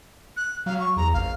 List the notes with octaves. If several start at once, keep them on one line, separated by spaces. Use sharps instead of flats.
F#6
F#3 F5
C#6
E2 A#5
G#1 F5